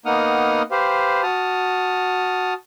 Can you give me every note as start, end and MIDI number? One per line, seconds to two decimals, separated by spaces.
0.06 0.62 58
0.06 0.62 59
0.06 0.62 63
0.06 0.62 78
0.06 0.62 87
0.06 0.62 89
0.71 1.22 67
0.71 1.22 71
0.71 1.22 72
0.71 1.22 77
1.23 2.54 66
1.23 2.54 81
1.23 2.54 87
1.23 2.54 89